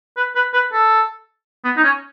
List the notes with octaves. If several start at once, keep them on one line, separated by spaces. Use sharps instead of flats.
B4
B4
B4
A4
B3
D#4
C#4